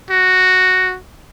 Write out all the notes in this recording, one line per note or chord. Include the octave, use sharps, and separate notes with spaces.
F#4